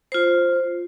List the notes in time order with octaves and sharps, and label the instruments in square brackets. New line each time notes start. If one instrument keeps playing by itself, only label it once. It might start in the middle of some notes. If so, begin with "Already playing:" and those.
[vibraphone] F4 C5